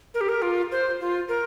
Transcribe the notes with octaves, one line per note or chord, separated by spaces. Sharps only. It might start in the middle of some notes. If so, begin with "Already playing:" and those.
A#4
G4
A#4
F4
C5
F4
A#4